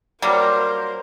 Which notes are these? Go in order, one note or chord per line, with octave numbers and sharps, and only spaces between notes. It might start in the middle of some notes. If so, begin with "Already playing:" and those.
F#3 G3 A#3 A#4 C5